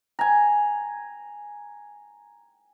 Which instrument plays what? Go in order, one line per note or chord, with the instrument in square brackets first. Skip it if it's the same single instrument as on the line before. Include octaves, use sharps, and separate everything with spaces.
[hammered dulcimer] G#5 A#5